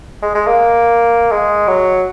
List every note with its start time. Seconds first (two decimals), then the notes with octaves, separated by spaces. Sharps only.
0.22 G#3
0.35 G#3
0.47 A#3
1.31 G#3
1.68 F#3